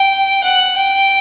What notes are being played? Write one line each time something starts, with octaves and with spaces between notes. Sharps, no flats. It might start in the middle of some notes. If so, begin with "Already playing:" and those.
Already playing: G5
F#5
G5